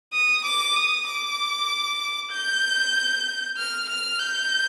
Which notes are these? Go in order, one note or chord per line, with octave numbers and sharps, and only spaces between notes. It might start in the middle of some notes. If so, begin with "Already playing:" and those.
D#6
D6
D#6
D6
G6
F6
F6
G6